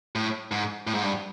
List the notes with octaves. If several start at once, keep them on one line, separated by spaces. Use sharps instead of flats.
A2
G#2
A2
G#2
G2